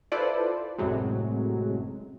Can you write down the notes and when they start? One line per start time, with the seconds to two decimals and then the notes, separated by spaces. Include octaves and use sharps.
0.12 E4 F4 A4 B4 C5 D5
0.78 A1 F#2 A2 C3 F#3 G#3